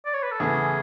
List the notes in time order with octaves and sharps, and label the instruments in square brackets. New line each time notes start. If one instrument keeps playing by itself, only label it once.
[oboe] D5
C#5
B4
A4
[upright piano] E2 C#3 E3 A3 E4 [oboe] G#4